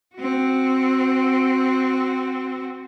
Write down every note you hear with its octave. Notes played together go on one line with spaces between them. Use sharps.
C4 F#4